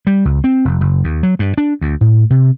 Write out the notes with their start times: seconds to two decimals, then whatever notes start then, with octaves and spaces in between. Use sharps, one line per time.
0.07 G3
0.25 C#2
0.44 C4
0.65 F1
0.81 F#1
1.04 D#2
1.23 F#3
1.39 G2
1.58 D4
1.81 D2
2.01 A2
2.30 C3